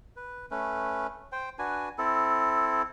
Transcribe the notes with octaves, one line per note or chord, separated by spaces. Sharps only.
B4
A3 C#4 B4
C5 G5
D4 F#4 B4 G#5
C4 E4 A4